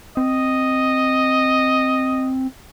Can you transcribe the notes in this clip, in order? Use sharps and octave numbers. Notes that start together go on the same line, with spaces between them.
C4 D#5